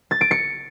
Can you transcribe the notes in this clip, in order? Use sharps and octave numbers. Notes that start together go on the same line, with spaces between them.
A6
D7
C#7